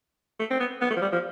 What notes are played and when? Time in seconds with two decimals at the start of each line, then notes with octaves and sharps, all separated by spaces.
0.40 A3
0.50 C4
0.60 B3
0.81 B3
0.91 A3
0.97 F3
1.02 G3
1.13 F3